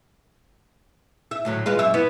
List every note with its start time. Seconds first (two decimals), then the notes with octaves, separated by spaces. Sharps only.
1.31 E5
1.45 D2 A2 F#3
1.66 G#3 F4 B4
1.79 F#2 E5
1.94 B3 E4